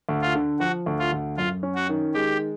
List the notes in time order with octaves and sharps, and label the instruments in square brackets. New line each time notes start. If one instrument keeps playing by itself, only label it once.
[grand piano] D2
[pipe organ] F4
[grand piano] D3
[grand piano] F3 [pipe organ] F#4
[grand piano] D2
[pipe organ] F4
[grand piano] D2
[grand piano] F#2 [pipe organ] F4
[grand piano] C#4
[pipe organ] F#4
[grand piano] D#3
[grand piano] G#3 [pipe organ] G4